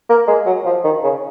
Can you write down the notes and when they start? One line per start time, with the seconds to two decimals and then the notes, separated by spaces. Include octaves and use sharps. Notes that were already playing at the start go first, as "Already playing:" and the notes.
0.09 A#3
0.28 G#3
0.46 F#3
0.66 F3
0.84 D#3
1.04 C#3